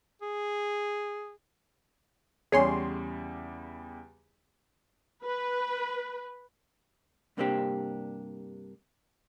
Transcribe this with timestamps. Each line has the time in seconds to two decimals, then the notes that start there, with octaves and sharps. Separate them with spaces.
0.22 G#4
2.52 E2 C#3 G3 G#4 C#5 C6
5.24 B4
7.37 G2 C3 A#3 C4 D4 G4